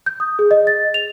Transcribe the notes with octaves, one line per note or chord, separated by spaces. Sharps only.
G6
D#6
G#4
D#5
A6
F7